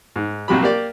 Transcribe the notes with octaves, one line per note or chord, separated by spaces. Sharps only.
G#2
A#1 C3 F#3 G4 B5
A#3 G4 D5